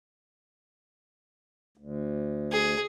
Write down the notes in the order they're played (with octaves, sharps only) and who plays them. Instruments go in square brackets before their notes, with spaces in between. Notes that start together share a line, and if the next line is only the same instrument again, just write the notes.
[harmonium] D2
[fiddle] G#4